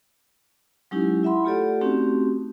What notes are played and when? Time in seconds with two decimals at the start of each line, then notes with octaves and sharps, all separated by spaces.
0.91 F#3 G#3 C#4 D#4 E4 G4
1.23 E4 E5 F#5 B5 C6
1.45 A3 F4 G4 A4 D5 F#5
1.81 A3 C4 C#4 D#4 F#4 G4